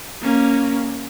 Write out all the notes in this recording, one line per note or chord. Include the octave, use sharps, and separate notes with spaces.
A#3 C#4